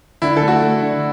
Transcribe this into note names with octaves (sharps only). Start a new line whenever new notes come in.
D3 E4
A3 A4
F#4
A3
D3